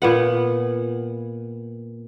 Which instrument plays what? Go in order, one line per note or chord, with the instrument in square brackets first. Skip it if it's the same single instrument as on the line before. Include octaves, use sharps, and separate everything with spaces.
[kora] A#2 B3 F#5